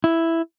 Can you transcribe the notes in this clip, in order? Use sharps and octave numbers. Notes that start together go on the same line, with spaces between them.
E4